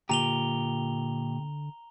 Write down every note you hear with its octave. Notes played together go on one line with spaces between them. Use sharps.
A#2 D3 G4 A#5 F7 G7